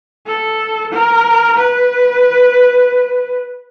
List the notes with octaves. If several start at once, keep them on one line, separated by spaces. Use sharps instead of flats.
A4
A#4
B4